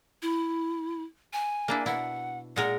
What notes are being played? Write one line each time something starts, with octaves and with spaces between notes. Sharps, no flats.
E4
G#5
A#3 D4 E4
B2 E4 F#5
A#2 G#3 A#4 F#5